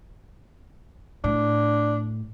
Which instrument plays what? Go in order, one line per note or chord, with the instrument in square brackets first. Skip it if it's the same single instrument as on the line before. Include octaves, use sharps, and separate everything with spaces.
[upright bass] A2 [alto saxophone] D4